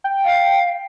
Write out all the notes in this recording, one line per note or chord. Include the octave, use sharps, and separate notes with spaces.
G5
F5